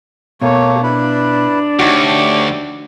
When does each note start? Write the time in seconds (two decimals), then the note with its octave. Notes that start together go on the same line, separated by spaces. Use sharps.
0.42 B2 A3 A#3 C#5
0.83 D4 E4 B4
1.79 D2 D#4 F#4 G4 C#5